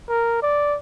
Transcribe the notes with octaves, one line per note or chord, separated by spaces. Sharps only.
A#4
D5